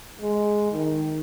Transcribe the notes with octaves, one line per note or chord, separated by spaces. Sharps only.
G#3
D#3